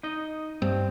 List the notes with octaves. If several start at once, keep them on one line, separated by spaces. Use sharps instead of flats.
D#4 D#5
G2 C4